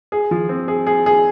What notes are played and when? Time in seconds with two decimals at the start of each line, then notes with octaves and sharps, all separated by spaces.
0.12 G#4
0.31 F3
0.49 C4
0.68 G#4
0.87 G#4
1.06 G#4